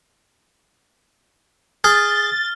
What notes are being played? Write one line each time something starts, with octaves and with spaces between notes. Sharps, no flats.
G#4 F6 A6